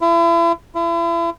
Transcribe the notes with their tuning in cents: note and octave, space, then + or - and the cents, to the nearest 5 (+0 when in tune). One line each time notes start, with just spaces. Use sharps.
E4 +40
E4 +40